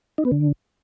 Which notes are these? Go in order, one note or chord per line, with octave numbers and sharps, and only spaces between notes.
D#4
B3
D3